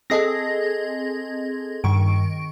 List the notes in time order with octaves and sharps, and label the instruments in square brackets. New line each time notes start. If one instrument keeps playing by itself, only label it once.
[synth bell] C4 G#4 [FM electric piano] A4 D#5 A#6
[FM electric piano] G2 [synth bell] D#3 C#6 D7